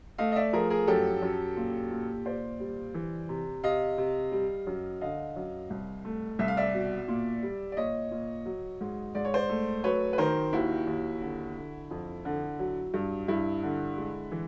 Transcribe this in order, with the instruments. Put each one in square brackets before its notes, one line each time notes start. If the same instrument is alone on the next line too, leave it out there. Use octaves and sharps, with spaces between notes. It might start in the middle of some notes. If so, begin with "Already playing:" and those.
[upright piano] A3 D#5 F5
D#5
D5 E5
F3 G#4 A#4
G#4 A#4
F#2 G4 A4
F#2
A#2
A#2
A#2 C5 D5
G3
E3
C3
C3 D#5 F5
C3
G3
F#2
D3 D#5 F5
F#2
C2
A3
C2 E5
F5
D5 E5
B2
A#2
G3
D5
A#2 C#5 D#5
A#2
F#3
G#2
G#2 D5
C#5
C5 D5
A3
F#3 B4 C#5
B4
D#3 A#4 C5
D#2 E4 F#4
D#2
D3
D3
F2
D3
F#3
G2
G2 E4
D3
G#3
E3